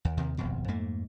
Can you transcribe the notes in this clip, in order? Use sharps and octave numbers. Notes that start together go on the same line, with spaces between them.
D#2
D#2 C3 D#3
D#1 G#1 F2 B2
F2 G#2 A3 A#3